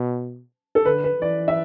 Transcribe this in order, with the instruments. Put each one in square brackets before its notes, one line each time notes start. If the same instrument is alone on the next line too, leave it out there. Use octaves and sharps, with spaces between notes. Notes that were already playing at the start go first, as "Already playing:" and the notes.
Already playing: [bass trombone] B2
[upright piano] A4
[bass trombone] D3 [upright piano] B4
[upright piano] B4
[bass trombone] E3 [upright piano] D5
[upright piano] E5